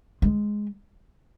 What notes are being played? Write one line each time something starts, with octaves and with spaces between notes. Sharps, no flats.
G#3